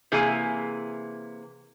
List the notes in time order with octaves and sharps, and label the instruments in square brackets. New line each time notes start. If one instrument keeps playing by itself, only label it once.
[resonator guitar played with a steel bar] C3 E3 A#3 G#4 G#5